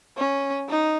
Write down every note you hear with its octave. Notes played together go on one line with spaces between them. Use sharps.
C#4
D#4